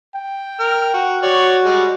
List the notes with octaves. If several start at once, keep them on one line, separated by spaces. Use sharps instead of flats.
G5
A#4 F6
F#4
F#4 C#5 D5
G3 G#3